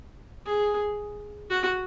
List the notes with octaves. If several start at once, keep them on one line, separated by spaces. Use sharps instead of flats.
G#4
F#4